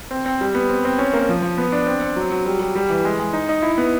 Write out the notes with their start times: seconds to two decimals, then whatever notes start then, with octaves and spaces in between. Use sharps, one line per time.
0.11 C4
0.26 C4
0.41 G3
0.55 B3
0.69 C4
0.85 C4
0.98 C#4
1.14 A#3
1.29 F3
1.42 F3
1.58 B3
1.72 D4
1.87 C4
2.02 C4
2.16 F#3
2.32 F#3
2.46 G3
2.60 G3
2.75 G3
2.90 E3
3.05 G#3
3.20 G#3
3.33 D#4
3.49 D#4
3.62 E4
3.78 B3